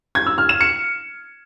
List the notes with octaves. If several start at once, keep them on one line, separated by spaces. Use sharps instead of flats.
G#6
E6
F6
E7
C#7